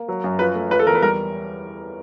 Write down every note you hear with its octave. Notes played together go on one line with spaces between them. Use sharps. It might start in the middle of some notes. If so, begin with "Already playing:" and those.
Already playing: A#3
F#3
F#2
F3 B4
A3
F3 B4
A4
E2 A#4
B4
G3 A#4